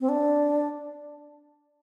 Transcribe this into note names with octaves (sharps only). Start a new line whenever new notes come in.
C4
D4